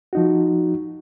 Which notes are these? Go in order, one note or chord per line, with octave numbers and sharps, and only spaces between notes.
F3 D#4 F#4